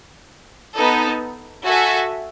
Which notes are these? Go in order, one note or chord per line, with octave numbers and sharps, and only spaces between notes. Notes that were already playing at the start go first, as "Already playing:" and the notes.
B3 D#4 A4
F#4 A4 E5 G#5